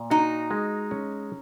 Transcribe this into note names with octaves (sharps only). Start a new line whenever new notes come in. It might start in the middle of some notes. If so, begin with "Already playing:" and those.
Already playing: A#2
D#4 F#4
G#3
C#4